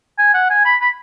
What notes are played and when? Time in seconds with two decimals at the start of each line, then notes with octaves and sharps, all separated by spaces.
0.19 G#5
0.34 F#5
0.50 G#5
0.65 B5
0.81 B5